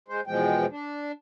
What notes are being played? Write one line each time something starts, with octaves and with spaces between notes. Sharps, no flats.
G#3 C5
E2 B2 F3 G#3 G5
D4